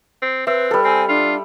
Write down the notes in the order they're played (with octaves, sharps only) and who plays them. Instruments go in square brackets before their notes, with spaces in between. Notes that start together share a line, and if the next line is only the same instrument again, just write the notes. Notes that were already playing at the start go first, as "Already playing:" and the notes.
[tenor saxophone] C4
[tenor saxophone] C4 [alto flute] B4 [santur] E5
[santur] G3 A4
[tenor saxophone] C4 [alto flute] G#5
[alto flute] D4 [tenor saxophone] F4